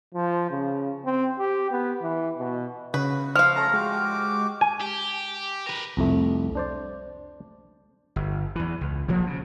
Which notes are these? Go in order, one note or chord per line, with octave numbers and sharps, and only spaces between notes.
F3
C#3
C4
G4
B3
E3
B2
C#3 F#4 B4
F3 F5 F6
A3 C#4 A4 A#5
G#3 F#4 G4 D6
G#5
G4
A#4 B4
C2 F2 A3
D4 C5 D5
G1
E2 E3
C#2
A#1 F3 F#3 A#3
C#3